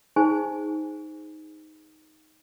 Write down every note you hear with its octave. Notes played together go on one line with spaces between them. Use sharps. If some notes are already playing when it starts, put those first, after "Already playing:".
D#4 G#4 C5 G#5